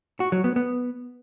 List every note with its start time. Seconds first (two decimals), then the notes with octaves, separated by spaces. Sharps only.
0.20 F#4
0.32 F#3
0.44 B3
0.56 B3